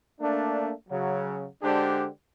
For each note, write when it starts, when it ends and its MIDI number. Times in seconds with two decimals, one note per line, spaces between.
0.20 0.72 57
0.20 0.72 58
0.20 0.72 62
0.89 1.47 49
0.89 1.47 54
1.63 2.07 50
1.63 2.07 56
1.63 2.07 62
1.63 2.07 67
1.63 2.07 72